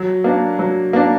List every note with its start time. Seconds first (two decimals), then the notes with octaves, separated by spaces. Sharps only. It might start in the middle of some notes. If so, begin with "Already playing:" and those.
Already playing: F#3
0.24 A#3 D4
0.59 F#3
0.93 A#3 D4